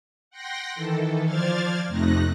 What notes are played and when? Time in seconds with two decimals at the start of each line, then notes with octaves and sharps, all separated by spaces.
0.30 F#5 G5 C6 A#6
0.75 D#3 E3 A4
1.24 F3 C5 D5 F6 G#6 A6
1.87 F2 C3 A3 D#4 F#6 A#6